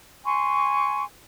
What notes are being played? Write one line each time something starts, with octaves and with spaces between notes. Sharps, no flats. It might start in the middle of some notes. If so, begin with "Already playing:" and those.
G#5 C6 C#6